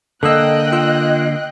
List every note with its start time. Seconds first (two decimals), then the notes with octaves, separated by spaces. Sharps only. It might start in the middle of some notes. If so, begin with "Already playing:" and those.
0.23 D3 A#3 A4 D#5 G5 D#6 E6 F#6
0.72 F4 E6